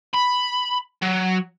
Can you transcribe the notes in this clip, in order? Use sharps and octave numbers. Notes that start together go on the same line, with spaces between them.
B5
F#3